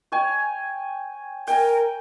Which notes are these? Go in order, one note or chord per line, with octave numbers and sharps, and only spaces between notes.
C#5 G5 G#5
A#4 G5 G#5